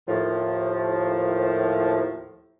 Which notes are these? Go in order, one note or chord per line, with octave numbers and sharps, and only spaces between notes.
D#2 A2 F3